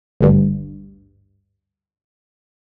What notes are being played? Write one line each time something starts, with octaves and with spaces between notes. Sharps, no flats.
G#1 D2 G2